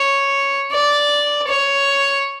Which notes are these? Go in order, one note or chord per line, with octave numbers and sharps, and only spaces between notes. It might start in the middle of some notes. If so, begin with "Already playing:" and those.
Already playing: C#5
D5
C#5